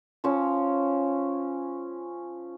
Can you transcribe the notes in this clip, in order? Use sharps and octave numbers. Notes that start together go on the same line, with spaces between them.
F3 C#4